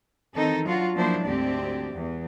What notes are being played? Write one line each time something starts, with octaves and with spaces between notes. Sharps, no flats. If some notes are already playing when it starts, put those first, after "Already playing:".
D#3 E3 C4 D#4 A4
F#3 D4 F4 F#4 F5
F3 F#3 A#3 D4 E4 C5
D2 G#2 C4 G4 D5
E2